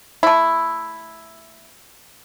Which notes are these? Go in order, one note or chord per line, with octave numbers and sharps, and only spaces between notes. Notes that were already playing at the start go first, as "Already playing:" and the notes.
A3 E4